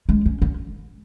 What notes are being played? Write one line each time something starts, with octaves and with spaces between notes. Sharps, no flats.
G#3
C#4
C#4